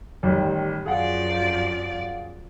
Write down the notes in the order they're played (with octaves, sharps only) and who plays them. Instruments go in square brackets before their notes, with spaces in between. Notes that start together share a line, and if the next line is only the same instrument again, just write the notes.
[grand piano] A1 D#3 G3
[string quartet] F#2 F3 D5 [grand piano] G#4 F5 F#5